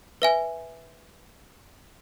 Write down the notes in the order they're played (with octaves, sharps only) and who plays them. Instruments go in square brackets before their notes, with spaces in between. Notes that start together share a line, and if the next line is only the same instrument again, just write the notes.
[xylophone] B4 E5 G#5